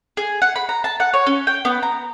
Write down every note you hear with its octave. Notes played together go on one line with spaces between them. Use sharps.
G#4
F#5
B5
A#5
A5
F#5
C#5
C#4
G5
B3
A#5